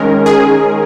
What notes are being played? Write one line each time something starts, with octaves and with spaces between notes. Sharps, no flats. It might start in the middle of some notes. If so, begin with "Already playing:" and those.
Already playing: D#3 G#3 C#4 A#4
G#4